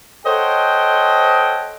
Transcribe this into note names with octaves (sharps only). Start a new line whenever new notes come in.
A4 C5 C#5 D#5 F#5 G5